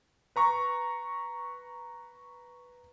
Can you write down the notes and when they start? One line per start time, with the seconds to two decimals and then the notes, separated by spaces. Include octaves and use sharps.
0.36 B4 A#5 C#6